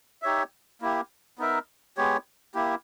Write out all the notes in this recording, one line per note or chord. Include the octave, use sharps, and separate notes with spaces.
D#4 G4 C#5 E5
A#3 E4 G4
B3 D#4 A#4 E5
G#3 B3 G4 C#5
A#3 E4 G4